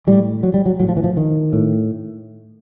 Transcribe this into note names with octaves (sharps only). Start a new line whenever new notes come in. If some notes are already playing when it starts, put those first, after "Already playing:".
A2 G3
F#3
G3
F#3
A2 F#3
F3
E3
F3
D#3
A2